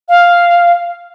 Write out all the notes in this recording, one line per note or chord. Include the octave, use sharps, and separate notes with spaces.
F5